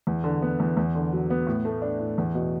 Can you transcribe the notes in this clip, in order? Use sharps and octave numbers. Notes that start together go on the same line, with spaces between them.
E2
D3
B3
E2
E2
D3
F#3
B3
A2
A3
D4
A2
E2
B2